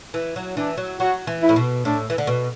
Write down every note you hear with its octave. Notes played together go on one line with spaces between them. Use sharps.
E3
F#3
E3 D4
F#3
F#3 F#4
E3
E4
A2
B2
A2 D4
E3
D3
B2